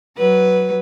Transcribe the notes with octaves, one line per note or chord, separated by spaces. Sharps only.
F#3 B4